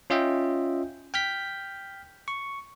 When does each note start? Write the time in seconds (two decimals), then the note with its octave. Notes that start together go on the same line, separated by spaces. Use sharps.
0.10 C#4 F4 D#5 E5 G5
1.14 G5 F6 G6 B6
2.28 C#6